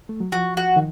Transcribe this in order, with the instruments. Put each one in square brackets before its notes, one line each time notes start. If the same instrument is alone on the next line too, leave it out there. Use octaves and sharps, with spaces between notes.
[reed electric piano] A3
F#3
[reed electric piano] F3 [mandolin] F#4
[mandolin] F#4
[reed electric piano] D#3